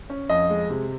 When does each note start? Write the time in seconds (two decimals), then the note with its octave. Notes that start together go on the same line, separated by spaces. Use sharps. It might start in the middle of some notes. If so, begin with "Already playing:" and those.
0.10 C#4
0.29 F2 D#5
0.50 G#3
0.70 C3